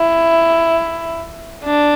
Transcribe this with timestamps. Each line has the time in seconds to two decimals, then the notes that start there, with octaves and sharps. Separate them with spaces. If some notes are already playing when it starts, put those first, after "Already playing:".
Already playing: E4
1.64 D4